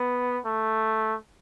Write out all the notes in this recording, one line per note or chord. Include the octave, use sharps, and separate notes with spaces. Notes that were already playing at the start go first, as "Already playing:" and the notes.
Already playing: B3
A3